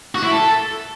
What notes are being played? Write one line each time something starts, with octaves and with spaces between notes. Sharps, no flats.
F#4
E4
A4